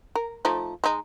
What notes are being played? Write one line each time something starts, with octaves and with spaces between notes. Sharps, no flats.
A#4
F3 A3 D#4
G#3 D#4